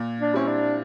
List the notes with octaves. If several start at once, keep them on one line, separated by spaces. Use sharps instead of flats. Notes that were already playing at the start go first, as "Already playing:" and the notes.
Already playing: A#2
D4
G3 C4 C#4 E4
D4